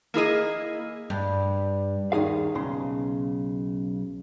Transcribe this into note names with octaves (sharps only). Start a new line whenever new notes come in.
A#3 E4 G#4 D#5
G2
D#2 D#3 D#4 G#4 F5
B1 C#3 C6